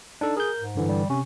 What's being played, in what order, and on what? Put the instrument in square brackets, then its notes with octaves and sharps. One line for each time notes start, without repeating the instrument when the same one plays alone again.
[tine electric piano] D4 D#4 A4
[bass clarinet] G#4 [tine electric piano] A#4 G6
[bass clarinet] G#2
[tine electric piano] G2 D3 E3
[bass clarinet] G3
[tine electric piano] C3 [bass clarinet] C#4